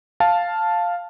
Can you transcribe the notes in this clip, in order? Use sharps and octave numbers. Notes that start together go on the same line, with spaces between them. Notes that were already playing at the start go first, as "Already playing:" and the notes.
F5 A5